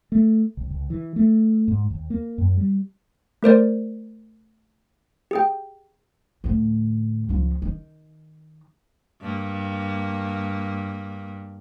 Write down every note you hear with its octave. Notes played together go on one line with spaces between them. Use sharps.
A3
C2
C#2
E3
A3
G#2
D#2
A#3
F#2
G3
A3 A#4 C5 D5
G4 G#4 G5
D2 A2
C#2 F3
D#3
G2 A#3